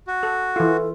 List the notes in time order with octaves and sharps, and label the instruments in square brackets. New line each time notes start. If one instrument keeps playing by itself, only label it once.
[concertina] F#4
[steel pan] A4
[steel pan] E3 F4 [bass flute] A4